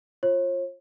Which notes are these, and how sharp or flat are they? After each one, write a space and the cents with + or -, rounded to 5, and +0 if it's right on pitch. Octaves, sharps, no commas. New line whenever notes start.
F4 +0 C#5 -45